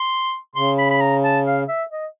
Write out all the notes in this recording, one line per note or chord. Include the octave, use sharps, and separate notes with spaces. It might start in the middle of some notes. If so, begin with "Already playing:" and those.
Already playing: C6
C#3 C6
B5
B5
A#5
A5
F5
E5
D#5